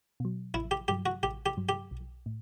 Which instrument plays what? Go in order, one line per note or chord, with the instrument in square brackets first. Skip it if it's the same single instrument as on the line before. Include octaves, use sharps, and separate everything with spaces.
[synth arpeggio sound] B2 F#3
[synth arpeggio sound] A1 [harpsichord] E4
[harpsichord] G4
[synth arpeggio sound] G2 F#3 [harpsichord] G4
[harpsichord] F#4
[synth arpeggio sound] A1 [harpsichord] G4
[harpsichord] G4
[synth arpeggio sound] G2 F#3
[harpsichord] G4
[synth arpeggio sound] B1
A2